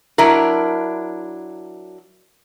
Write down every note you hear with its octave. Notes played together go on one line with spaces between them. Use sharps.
F#3 D4 E4 A#4